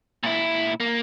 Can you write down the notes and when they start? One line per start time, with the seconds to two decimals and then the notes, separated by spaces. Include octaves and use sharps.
0.23 A#2 E4
0.80 A#3